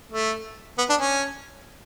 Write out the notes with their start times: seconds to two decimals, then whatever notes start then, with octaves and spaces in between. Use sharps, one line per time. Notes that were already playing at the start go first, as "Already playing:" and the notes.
0.12 A3
0.78 B3
0.89 D4
1.00 C#4